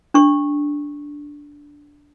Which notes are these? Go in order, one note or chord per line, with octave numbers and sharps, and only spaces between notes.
D4 C#6